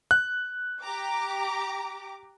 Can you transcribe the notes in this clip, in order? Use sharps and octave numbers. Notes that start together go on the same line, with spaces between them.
F#6
G4 A#5 D6